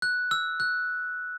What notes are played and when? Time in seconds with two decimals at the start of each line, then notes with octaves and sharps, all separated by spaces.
0.02 F#6
0.31 E6
0.60 F#6